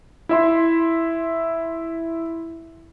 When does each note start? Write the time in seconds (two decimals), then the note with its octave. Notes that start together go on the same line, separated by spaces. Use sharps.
0.29 E4 E5 C6